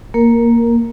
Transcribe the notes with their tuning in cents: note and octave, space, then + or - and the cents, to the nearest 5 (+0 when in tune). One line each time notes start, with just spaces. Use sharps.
A#3 +0 A#4 +0